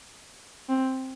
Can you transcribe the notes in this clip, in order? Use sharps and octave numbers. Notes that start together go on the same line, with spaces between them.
C4